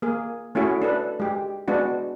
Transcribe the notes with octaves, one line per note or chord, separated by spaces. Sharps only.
A#3 G#4
A3 C#4 E4 F#4 G#4
D4 A4 B4
G#3 G4
G#3 B3 D4 F#4